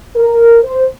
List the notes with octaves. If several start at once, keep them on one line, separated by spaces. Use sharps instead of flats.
A#4
C5